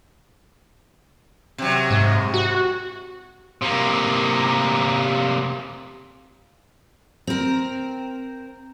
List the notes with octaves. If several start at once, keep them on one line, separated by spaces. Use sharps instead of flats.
C3 F#3
G#2
F#4
C3 A#3
C4 A#4